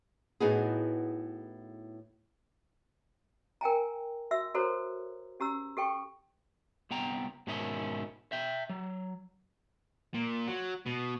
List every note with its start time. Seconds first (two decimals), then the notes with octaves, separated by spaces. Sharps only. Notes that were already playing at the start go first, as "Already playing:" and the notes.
0.40 A2 B3 D#4 E4 F#4 G#4
3.61 A#4 G5 G#5 A#5
4.31 F#4 E5 E6
4.54 F#4 A4 A#4 C5 C#5 A#5
5.40 C#4 G4 A#5 E6
5.77 G4 A4 G5 C#6
6.91 C2 B3 G5 A#5
7.47 G#2 B2 D#3 C#4 E4 D#5
8.32 E5 G5
8.70 F#3
10.14 A#2
10.48 F#3
10.86 B2